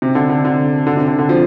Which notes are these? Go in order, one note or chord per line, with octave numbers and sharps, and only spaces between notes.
C3
D3
D3
D3
D3
C3
D3
D3
F3